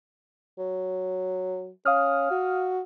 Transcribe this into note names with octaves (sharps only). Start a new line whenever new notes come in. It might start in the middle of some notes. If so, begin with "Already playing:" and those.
F#3
C#4 F5 D#6 F6
F#4